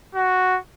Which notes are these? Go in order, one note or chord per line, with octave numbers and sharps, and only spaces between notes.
F#4